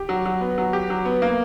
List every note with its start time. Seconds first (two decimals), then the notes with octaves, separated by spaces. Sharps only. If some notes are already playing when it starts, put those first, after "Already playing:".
Already playing: G4
0.09 F#3
0.25 F#3
0.41 B3
0.58 F#3
0.73 G4
0.90 F#3
1.05 B3
1.22 A#3